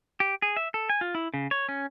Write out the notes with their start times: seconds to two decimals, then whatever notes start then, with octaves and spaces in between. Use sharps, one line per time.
0.20 G4
0.42 G#4
0.57 E5
0.74 A4
0.89 G#5
1.01 F4
1.15 E4
1.34 C#3
1.51 C#5
1.69 C#4